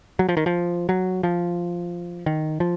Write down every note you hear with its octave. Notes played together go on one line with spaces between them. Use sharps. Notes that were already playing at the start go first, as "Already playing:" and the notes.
F#3
F3
D#3
F3
F#3
F3
D#3
F3